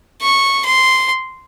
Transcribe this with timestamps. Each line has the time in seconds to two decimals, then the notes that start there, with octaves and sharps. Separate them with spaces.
0.22 C#6
0.65 C6